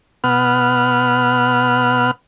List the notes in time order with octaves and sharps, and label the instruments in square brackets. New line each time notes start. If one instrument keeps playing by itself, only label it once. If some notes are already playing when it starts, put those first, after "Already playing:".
[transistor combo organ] B2 B3 F#5 F6